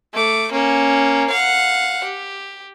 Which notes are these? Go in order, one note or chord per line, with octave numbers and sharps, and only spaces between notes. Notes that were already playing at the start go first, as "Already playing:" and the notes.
A3 D6
A#3 C#4
F5 F#5
G4